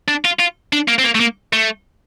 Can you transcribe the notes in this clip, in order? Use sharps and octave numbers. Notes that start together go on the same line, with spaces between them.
D4
F4
F4
D4
A#3
C4
A#3
A3
A#3
A3